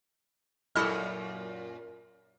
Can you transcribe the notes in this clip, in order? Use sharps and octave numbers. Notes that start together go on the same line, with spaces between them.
F#2 A#2 E4 G4 A4 D#5 F6 C#7